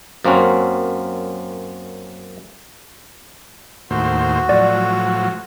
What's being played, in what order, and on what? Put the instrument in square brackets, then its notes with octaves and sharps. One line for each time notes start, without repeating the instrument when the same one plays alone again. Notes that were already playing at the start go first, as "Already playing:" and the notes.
[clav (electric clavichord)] F#2 A#3 C4 C#4 F#4
[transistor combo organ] D#2 A2 C5 [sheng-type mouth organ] F#4
[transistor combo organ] A2 F3 F#3 [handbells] D5